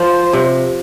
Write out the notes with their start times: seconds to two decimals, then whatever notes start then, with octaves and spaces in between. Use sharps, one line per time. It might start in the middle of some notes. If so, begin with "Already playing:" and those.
Already playing: F3 C5
0.33 C3